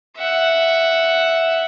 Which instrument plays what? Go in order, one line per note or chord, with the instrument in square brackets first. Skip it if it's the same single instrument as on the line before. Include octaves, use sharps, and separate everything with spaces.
[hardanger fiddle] E5 F#5